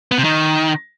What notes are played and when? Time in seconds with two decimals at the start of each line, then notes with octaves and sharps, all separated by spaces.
0.12 B3
0.18 C3
0.24 D#3